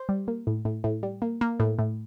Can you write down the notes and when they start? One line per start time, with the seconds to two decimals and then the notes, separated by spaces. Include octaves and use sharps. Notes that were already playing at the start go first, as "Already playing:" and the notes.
Already playing: C5
0.09 G3
0.28 A#3
0.47 A2
0.65 A2
0.84 A2
1.03 G3
1.22 A#3
1.41 A#3
1.60 A2
1.79 A2